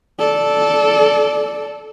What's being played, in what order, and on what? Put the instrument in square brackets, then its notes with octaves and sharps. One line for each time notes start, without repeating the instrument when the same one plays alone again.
[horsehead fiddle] A4 D5